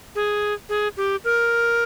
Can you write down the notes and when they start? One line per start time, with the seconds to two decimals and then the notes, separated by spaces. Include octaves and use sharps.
0.15 G#4
0.69 G#4
0.97 G4
1.24 A#4